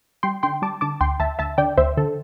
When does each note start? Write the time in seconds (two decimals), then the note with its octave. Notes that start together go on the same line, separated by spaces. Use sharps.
0.23 G3 G5 C6
0.43 D3 G5 C6
0.62 G3 A5 D6
0.81 D3 A5 D6
1.01 D2 G5 C6
1.20 D2 E5 A5
1.39 D2 E5 A5
1.58 D3 D5 G5
1.78 D2 C5 E5
1.97 D3 A4